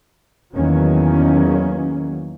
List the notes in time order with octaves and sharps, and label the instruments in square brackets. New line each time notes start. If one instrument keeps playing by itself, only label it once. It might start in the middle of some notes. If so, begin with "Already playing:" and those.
[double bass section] E2 D#3 F#3 A#3 C#4